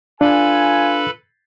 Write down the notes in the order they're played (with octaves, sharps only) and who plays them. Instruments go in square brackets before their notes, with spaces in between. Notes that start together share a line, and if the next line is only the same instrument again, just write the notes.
[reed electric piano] D4 [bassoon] F4 [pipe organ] A4 B4 B5 [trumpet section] G#5